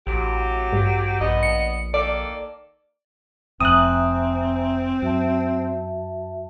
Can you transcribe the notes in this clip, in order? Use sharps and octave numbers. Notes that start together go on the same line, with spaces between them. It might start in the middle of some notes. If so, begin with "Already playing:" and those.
A1 F#3 G4
G2
A#1 B3 D#5
C#7
D#3 A#3 A4 D5
F1 F2 C4 E5 G#5 A#5 D#6 F#6
F#2 F#4 E5 A5